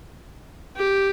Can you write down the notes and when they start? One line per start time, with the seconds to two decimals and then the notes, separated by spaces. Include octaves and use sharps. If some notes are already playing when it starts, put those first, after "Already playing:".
0.77 G4